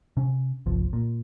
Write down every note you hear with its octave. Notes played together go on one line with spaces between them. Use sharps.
C3 C#4
G1 C2 F3
A#2